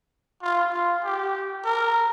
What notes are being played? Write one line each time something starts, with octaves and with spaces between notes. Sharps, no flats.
F4
F4
G4
A#4